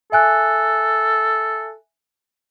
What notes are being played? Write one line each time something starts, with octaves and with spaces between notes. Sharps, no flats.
A4 E5 G#5 F#6